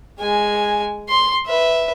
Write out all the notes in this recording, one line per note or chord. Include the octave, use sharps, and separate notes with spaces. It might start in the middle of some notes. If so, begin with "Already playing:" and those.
G#3 G#5
C6
B4 E5